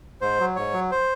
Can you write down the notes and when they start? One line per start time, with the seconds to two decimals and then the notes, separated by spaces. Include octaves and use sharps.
0.21 G#2 C5
0.40 F#3
0.56 G#2 C#5
0.74 F#3
0.91 C5